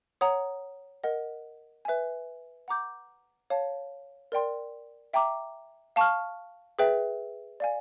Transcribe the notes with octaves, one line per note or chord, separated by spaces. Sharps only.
C#5 F#5 A#5 D#6
A#4 D#5 F#5
B4 E5 G#5
F#5 A#5 D6 G6
C#5 F5 A5
A#4 D5 G5 C6
E5 G5 A#5 D6
F5 A5 C#6 F6
G#4 B4 E5 G5
D5 F5 G#5